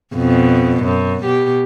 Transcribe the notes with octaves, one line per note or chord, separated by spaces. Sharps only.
F2 B2
F#2
B2 G4